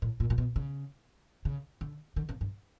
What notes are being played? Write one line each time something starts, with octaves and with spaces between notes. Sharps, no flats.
A2
A#2
A#2
B2
C#3
C#3
D3
D3
C#3
G2